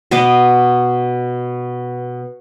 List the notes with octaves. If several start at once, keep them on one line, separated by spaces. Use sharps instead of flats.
B2 B3 D#5 D6